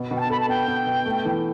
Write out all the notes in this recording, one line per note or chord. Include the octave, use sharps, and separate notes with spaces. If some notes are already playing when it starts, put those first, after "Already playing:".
Already playing: B2
B2
G5
A5
A4 B5
A5
B3 G5
B3
B2
A3
E3